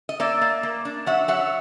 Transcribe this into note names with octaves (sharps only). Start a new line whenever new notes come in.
D#5
A#3 D5 E5
A#3
A#3
D4
F#3 E5 F#5
F#3 E5 F#5